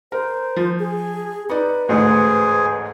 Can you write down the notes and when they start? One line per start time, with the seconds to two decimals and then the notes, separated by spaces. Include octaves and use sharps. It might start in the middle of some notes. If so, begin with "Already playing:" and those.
0.12 A#4 C5
0.56 F3
0.79 G#4
1.50 D#4 B4 D5
1.89 A1 D2 G#2 G#4 C5 G#5